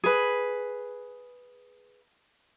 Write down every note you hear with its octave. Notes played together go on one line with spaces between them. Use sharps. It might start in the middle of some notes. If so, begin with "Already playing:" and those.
G#4 B4